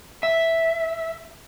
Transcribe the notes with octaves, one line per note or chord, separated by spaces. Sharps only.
E5